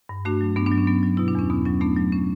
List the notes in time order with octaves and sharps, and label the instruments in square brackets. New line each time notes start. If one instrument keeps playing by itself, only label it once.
[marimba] G2
A3 D4 F#4
F#3
G2 B3 D4
B3 D4
F#3
C#4
F#3 B3
F#3
B2 E4
D4
E2 C#4
B2 B3
F#3 C#4
A3 B3 D4
F#3
C#4